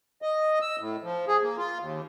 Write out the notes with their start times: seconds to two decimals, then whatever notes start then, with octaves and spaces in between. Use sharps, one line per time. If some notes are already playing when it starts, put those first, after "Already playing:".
0.22 D#5
0.62 E6
0.79 A2
1.03 F3
1.28 G#4
1.43 A#3
1.58 F4
1.80 D#2